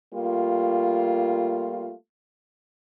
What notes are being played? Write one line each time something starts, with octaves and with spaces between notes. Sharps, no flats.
G3 A3 A#3 F4